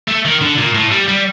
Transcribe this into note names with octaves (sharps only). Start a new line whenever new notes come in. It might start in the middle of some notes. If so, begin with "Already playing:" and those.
A3
D#3
D3
A#2
A2
G3
G3